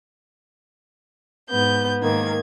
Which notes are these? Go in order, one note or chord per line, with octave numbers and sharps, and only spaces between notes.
G#2 B3 G6
G#2 D#3 A#3 G#6